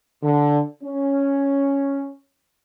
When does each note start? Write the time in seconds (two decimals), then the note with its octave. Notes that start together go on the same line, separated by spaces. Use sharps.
0.23 D3
0.84 C#4